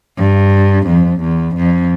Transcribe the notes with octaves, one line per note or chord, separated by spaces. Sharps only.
G2
F2
E2
F2